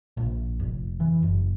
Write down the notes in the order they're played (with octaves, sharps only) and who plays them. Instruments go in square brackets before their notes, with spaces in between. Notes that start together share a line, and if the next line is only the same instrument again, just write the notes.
[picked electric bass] A#1
F1
E3
F#1